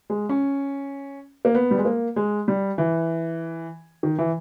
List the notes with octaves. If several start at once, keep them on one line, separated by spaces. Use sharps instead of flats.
G#3
C#4
A#3
B3
G3
G#3
A#3
G#3
G3
E3
D#3
E3